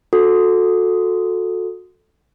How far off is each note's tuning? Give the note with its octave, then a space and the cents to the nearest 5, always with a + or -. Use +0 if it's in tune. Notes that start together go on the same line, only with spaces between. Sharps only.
F#4 -25 A4 +0